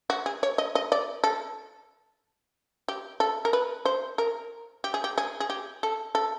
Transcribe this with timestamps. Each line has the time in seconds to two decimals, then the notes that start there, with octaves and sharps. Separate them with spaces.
0.10 F#4
0.26 G#4
0.43 C#5
0.58 D#5
0.75 D#5
0.92 D5
1.24 A4
2.88 G4
3.20 A4
3.45 A#4
3.53 B4
3.85 C5
4.18 A#4
4.84 G4
4.94 G#4
5.04 G4
5.18 G#4
5.40 G#4
5.50 G4
5.83 A4
6.15 A4